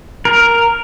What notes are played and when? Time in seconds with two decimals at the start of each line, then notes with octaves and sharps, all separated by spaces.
0.25 A#4